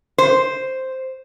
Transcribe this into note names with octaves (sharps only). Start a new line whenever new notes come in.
C5